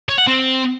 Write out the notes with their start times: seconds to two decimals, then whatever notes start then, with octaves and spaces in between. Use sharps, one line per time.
0.09 C#5
0.18 F#5
0.27 C4